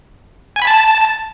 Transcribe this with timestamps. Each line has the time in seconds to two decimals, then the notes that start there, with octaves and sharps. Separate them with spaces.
0.56 G#5
0.62 B5
0.67 A5